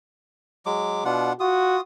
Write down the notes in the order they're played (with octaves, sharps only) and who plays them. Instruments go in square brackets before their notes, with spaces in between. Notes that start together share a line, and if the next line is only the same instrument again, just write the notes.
[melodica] F#3 G#3 D6
[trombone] B2 [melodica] D4 F4 F#5
[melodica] F4 D#6 [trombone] F#4